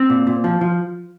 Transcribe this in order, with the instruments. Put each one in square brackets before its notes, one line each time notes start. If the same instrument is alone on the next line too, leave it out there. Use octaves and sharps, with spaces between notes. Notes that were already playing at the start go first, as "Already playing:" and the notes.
Already playing: [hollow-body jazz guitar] C4
A#2
A#2
F3
F3